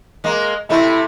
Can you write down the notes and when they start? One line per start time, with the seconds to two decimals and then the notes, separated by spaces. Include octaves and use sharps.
0.24 G#3 A#3
0.70 C3 A3 E4